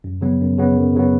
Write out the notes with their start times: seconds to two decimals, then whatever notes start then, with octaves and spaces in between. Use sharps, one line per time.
0.04 F#2
0.21 C#3 F#3 B3
0.41 F#2
0.58 C#3 F#3 B3
0.77 F#2
0.95 C#3 F#3 B3